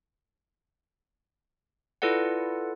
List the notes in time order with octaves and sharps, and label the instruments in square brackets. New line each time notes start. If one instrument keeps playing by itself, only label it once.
[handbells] E4 F4 A4 B4 D5 F#5